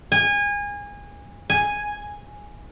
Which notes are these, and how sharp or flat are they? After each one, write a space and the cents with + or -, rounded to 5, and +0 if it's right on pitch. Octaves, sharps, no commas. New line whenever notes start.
G#5 -25
G#5 -5